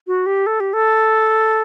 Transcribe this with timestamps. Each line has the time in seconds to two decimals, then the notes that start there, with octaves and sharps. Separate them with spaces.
0.07 F#4
0.26 G4
0.46 A4
0.60 G4
0.73 A4